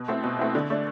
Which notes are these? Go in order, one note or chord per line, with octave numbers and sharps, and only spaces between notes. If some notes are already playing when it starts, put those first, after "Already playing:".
Already playing: B2
A3 C4 E4
B2
A3 C4 E4
D3
A3 D4